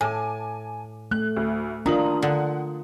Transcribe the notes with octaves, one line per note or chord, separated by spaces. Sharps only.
A2 G#5 A5 D6
A3 F#6
D2
D#3 D4 F4 A#4 A#5 D#6 F#7
D3 F#5